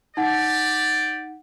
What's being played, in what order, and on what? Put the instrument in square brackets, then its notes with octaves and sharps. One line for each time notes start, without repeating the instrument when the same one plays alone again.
[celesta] D#4 F#5 [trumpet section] G4 D5